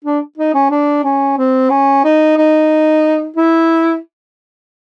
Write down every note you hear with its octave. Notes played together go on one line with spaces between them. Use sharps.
D4
D#4
C#4
D4
C#4
C4
C#4
D#4
D#4
E4